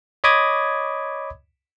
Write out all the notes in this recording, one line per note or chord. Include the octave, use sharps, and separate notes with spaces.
C#5 D#5 B5 D6 D#6 G#6